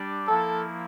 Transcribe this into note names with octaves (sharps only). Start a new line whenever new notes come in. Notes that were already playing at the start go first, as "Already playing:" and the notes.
Already playing: G3 D4 G4 D5
F3 A#3 E4 A4